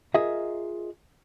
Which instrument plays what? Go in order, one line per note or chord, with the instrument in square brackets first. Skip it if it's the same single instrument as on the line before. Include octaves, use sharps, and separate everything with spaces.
[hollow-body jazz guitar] F4 G#4 A#4 D#5 E5